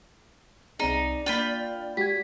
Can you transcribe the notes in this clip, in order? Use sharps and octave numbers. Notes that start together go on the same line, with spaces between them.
C2 C4 D#4 G#4 D5
A#3 D4 F4 G5 B5
G#3 F#4 G4 G#6 B6